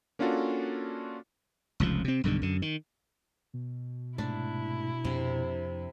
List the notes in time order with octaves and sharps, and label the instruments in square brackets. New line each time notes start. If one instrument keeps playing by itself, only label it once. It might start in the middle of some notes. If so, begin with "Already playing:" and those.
[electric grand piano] A#3 C#4 D4 F4 F#4 A4
[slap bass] F1 C#2 F3
C3 C4
B1 G2 D3 D#3
F#2 D3
D#3
[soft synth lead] B2
[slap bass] G#2 C3 A3 [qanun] D4 [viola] E4
[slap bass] F2 D4 [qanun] C3